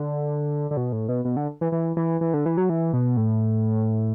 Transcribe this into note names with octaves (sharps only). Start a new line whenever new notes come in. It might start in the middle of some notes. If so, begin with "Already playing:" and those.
Already playing: D3
D3
B2
A2
B2
B2
D3
E3
E3
E3
E3
D3
E3
F#3
E3
B2
A2